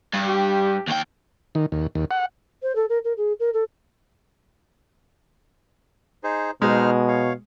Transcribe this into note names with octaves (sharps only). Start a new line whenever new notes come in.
G2
G4
D#2 G5
D#3
D#2
D#2
F#5
C5
A4
A#4
A#4
G#4
A#4
A4
D#4 G#4 C5
B2 G#3 D#4 C5 F6
C#5 F5